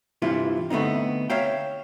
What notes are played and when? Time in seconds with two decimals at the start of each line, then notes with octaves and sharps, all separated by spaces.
0.22 G2 C3 E3 E4 F4
0.70 D3 A3 B3 C4 D#4
1.30 C#5 E5 F5 G5